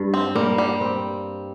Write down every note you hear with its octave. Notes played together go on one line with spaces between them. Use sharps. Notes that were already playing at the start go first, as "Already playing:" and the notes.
Already playing: G2
C4
G3 A#3
G3
C4